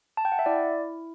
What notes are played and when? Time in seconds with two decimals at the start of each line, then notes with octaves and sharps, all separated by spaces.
0.17 A5
0.25 G5
0.32 F#5
0.39 E5
0.46 E4 D5